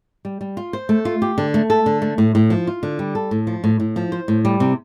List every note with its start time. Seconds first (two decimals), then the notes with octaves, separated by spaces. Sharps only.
0.25 G3
0.41 G3
0.57 F4
0.73 C5
0.89 A3
1.05 F4
1.22 G4
1.38 D3
1.54 A3
1.70 A4
1.86 D3
2.02 A3
2.18 A2
2.35 A2
2.50 F3
2.67 F4
2.83 D3
2.99 G3
3.15 A4
3.31 A2
3.47 F3
3.64 A2
3.80 A2
3.96 F3
4.12 C5
4.28 A2
4.45 G3
4.60 C3